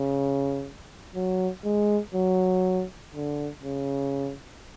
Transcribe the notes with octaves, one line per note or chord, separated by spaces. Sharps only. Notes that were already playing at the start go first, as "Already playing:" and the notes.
Already playing: C#3
F#3
G#3
F#3
D3
C#3